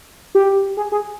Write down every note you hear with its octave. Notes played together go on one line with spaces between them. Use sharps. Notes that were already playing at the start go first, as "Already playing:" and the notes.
G4
G#4
G#4